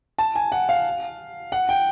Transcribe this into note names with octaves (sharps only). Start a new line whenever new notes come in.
A5
G#5
F#5
F5
F#5
G5